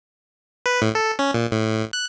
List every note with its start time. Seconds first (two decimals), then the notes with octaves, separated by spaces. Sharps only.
0.66 B4
0.82 A2
0.95 A4
1.19 C#4
1.34 A#2
1.52 A2
1.93 F#6